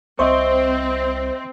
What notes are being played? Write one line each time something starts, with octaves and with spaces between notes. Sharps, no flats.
C2 C4 C5 D#5 E5 C#6